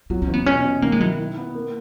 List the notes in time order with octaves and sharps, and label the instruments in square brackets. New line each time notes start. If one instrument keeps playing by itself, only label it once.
[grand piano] F#3 [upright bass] B3
[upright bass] C#4
[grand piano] E2
[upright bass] B3
[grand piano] B2 [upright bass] C#4
[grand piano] B2
[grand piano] D#3 [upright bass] A#3
[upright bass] G#3
[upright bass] F#3 [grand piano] E4
[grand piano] E4
B3
A#3